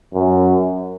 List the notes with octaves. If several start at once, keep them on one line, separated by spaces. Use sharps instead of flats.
F#2